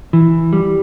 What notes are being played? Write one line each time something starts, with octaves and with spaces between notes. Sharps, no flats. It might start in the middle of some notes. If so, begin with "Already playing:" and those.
E3
G3